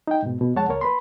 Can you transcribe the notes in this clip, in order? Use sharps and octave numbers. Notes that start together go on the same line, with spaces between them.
D#4 G5
G#2 B2
B2
F2 G#3 C#5 F#5 A5
C#2 A#3 A#4 C#5
B4 B5 C6